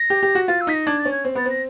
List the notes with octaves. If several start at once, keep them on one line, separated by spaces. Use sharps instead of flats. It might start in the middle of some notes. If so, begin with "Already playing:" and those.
Already playing: A#6
G4
G4
F#4
F4 A6
E6
D#4 B6
A#6
D4 G#6
A6
C#4
G#6
C4
B3 A6
C4 A#6